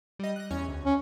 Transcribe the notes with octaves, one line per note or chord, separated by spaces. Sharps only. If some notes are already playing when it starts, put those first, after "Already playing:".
G3 D#5
F#6 A#6
E2 C#4 G#6
D2
C#4